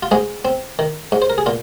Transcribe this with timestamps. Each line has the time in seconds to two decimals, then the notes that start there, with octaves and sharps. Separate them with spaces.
0.03 F4
0.11 G#2 G#3 G#4
0.45 C4
0.79 D#3
1.12 G#2
1.22 C5
1.30 A#4
1.38 G#4
1.46 A#2 F4